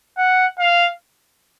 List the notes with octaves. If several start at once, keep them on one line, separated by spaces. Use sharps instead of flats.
F#5
F5